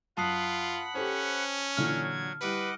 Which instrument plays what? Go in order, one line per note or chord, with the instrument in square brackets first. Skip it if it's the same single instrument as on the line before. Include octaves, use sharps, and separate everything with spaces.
[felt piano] F#2 [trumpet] F4 [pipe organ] F#5 B5 F#6 [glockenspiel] A5 D#6 C7
[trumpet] C#4 [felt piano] G4 A4 C5
[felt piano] A#2 D3 E3 [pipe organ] F#3 G#6 [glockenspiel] F6
[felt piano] G3 E4 G4 [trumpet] B4 [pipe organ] D#5 F#5 D6